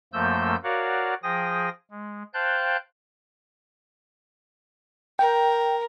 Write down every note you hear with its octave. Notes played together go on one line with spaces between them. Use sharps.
F#2 F3 A3 A#3 E6 G6
F#4 A#4 C#5 D5 F5 F#5
F3 G#4 G5 D#6 A#6
G#3
C5 F5 G5 A5 F#6 G6
A#4 G5